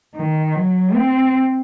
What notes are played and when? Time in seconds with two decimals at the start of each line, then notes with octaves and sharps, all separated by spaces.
0.16 D#3
0.55 F#3
0.94 C4